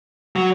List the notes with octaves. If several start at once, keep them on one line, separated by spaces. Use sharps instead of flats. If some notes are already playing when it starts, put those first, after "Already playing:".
F#3